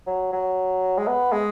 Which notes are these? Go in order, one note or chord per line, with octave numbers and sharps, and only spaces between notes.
F#3
F#3
G#3
B3
G#3